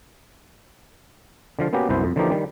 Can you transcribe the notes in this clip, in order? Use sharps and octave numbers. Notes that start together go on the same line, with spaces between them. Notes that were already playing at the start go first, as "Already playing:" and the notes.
D3 F3 F5
A#3 B3 C#4 F#4 G4
C2 F#2 B3 E4 C5
F2
D3 E3 F3 A#3 D#4 G4
D#3 G3